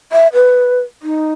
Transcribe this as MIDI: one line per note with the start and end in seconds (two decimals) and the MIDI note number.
0.12 0.27 76
0.33 0.80 71
1.03 1.33 63